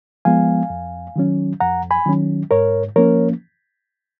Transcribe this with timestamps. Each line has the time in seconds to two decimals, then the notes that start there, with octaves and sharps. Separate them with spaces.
0.25 F3 G#3 B3 F5 G#5
0.70 F2
1.16 D#3 F#3 C#4
1.60 F2 F#5 A#5
1.91 G#5 B5
2.06 D#3 F#3 C#4
2.51 G#2 A#4 C#5
2.96 F3 A#3 C#4 A#4 C#5